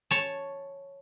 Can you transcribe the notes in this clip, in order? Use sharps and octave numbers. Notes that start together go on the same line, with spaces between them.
C#5 A5